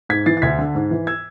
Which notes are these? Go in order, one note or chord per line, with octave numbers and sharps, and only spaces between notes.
G#2 G#6 B6
E3 A6 C7
A6
D2 G#6 B6
D3
G#2
E3
E6 G#6